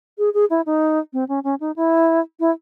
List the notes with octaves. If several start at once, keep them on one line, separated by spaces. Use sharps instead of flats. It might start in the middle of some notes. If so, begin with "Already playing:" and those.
G#4
G#4
E4
D#4
C4
C#4
C#4
D#4
E4
E4